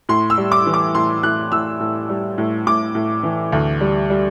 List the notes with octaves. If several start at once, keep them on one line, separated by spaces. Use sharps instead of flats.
A2 C6
E6
G3
D6
E3
D6
A2 C6
A2 F#6
A2 E6
A2
G3
A2
A2 D6
A2
E3
D2
G3
G3